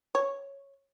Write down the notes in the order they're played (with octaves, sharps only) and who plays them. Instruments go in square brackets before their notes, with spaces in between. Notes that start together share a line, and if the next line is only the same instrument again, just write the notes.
[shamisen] C#5